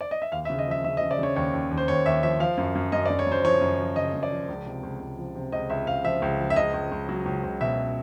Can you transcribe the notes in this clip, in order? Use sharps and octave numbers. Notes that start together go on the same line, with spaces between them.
D5
D#5
E5
D#2 F5
E5
C#3
D#5
F3 E5
C#3 E5
D#5
C#3
D5
C#3 C#5
D#2 C#5
D#2
D#2
C5
D#2 C#5
D#2 E5
F3 E5
F3 F5
F#2
F#2
F#2 D#5
D5
F#2
C#5
F#2
C5
F3 C#5
F#2
F3
C#3 D#5
F#2
D5
F3
C#2
C3
C#2
C#2
F3
C3
C#2 D#5
C#2 E5
C#2 F5
F3 E5
C#2
F3
E5
C#2 D#5
C#2
C#2
F#3
C#2
C#2
B2 E5